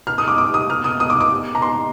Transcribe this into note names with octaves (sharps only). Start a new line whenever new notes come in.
F6
D#6
D6
D6
D#6
F6
D#6
D#6
D6
D6
A#5
C6